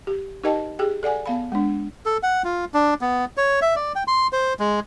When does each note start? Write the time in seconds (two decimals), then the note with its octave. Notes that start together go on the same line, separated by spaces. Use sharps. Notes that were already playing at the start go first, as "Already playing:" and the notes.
0.07 G4
0.44 D#4 G4 A#4 D#5 G5 A5
0.79 G4 G#4 G5
1.03 A4 D5 F#5 G#5
1.26 B3 F5 B5
1.52 G#3 D4
2.06 A4
2.23 F#5
2.44 F4
2.74 D4
3.01 B3
3.37 C#5
3.62 E5
3.76 D5
3.95 G5
4.07 C6
4.33 C5
4.59 G#3